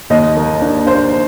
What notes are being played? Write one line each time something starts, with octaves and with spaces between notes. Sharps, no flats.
D#2 D#5
A#3
D4
D4 C5